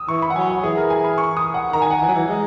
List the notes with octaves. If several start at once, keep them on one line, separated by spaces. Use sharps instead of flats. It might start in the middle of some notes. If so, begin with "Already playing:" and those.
Already playing: D#6 E6
E3 C#6
B5
F#5
F#3 G#5
F#5
E3 G#4
A#4
G#5
B5
C#6
D#6
F#5
D#3 A#5
G#5
F#5
E3 G#5
F#3
E3
G#3